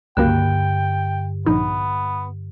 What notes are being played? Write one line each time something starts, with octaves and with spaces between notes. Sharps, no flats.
C#2 G2 D3 F#3 A#3 G5
A#1 B3 D#4